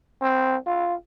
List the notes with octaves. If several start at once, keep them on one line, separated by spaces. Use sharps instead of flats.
C4
F4